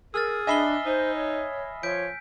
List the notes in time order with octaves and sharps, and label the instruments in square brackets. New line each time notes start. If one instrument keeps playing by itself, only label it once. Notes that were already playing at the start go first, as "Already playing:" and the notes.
[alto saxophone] G#4 [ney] A#4 [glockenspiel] E6 F6 A6
[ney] D4 [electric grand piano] D#5 E5 B5 [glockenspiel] G#5 C7 G7
[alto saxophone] D#4 [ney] C5
[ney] C#5
[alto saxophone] F3 [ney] C#5 [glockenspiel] G6 B6 D7